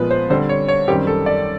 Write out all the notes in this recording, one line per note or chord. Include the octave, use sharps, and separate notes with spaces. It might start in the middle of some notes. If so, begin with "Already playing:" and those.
Already playing: A#2 F3 G#3 B3 B4
C5
D3 G3 C4 C5
C#5
C#5
F#2 D#3 G3 C4 G4
A4
D5